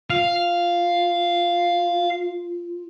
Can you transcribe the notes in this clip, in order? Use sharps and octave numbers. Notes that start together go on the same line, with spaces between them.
F4 F5